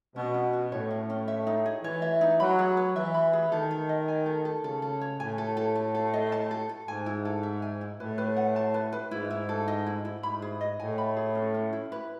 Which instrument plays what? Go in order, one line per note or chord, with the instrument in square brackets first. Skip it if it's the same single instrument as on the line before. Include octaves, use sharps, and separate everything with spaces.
[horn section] B2 [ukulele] C#4
[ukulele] C#4
F#4
[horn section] A2 [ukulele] C#5
[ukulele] C#4
C#4
E5
D#4
G#4
[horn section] E3 [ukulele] C#5
[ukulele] E5
D#4
[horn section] F#3 [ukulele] B5
[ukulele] G#4
B4
[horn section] E3 [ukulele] E5
[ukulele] B5
G#4
[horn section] D#3 [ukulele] A4
[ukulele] A4
D#5
G#5
A4
A4
[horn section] C#3 [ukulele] A4
[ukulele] A4
C#5
[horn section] A2 [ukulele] G#5
[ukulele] A4
A4
A4
A4
D#5
A5
A4
A4
[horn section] G#2 [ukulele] G#5
[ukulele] E4
A4
E5
G#5
E4
[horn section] A2 [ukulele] B4
[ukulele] B4
F#5
A5
B4
B4
[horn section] G#2 [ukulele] E4
[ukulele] E4
A4
D#5
E4
E4
[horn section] G#2 [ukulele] B5
[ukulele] G#4
D#5
[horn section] A2 [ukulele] G#5
[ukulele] B5
G#4
C#4
C#4
E4
B4